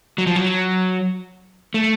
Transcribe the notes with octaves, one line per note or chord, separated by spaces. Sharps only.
F#3
F3
F#3
A3